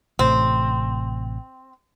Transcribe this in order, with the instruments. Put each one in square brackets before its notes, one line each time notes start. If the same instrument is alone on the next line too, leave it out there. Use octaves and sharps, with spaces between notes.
[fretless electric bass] A1 A2 C3 [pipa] C4